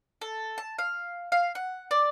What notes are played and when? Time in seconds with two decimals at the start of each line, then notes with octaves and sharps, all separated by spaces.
0.21 A4
0.58 A5
0.79 F5
1.32 F5
1.55 F#5
1.91 D5